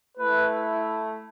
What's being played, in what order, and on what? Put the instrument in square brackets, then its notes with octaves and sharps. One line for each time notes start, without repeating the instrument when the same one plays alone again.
[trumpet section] A3 E4 B4